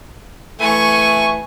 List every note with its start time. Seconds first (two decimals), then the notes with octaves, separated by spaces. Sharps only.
0.60 E3 A3 G#5 C#6